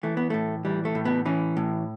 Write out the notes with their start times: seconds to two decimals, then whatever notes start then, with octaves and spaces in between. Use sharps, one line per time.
0.03 E3 A3
0.17 B3
0.30 A2 A3
0.65 E3 G3
0.85 A3
0.95 A2
1.05 B3
1.26 E3 C#4
1.57 A2